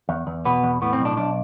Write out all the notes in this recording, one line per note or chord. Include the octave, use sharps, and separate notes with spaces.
E2
E2
B2 B3
E2
A2 B3
C4
B1
D4
B1 D4